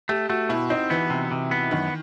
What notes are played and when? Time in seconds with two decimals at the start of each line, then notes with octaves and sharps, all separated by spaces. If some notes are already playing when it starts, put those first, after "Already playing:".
0.09 A3 G4
0.29 A3 F#4
0.49 B2 E4
0.70 C4 D#4
0.90 E3 B3
1.10 C3
1.31 C3
1.51 B3
1.71 F#2 D#3